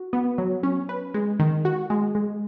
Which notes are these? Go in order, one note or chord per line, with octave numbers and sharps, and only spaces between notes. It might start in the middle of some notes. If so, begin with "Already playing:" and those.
Already playing: F#4
B3
F#3
C#4
B4
G#3
D#3
F#4
G#3
G#3